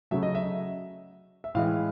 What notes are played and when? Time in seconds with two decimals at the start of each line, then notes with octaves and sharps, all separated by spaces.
0.11 C#3 F#3 A3 E5
0.23 D#5
0.35 E5
1.44 E5
1.55 A2 E3 G#3 F5